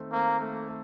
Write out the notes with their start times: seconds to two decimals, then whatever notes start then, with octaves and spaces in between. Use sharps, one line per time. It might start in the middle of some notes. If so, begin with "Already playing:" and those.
Already playing: D#3 A3 C4
0.12 A#3 C4
0.40 A3
0.68 A3